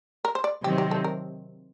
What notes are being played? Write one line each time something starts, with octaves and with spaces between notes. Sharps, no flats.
A#4
C5
D5
C3 D#3 F#3 C4 G4
G4
A4
A#4